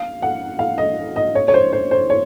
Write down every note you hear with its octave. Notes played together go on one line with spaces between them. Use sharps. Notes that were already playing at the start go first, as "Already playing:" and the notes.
Already playing: F5
F#5
F5
D#5
D#5
C#5
C#5
C5
C5
C5
C#5